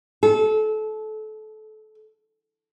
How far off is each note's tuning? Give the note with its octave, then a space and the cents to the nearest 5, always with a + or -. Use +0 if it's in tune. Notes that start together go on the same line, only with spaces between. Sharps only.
A4 -25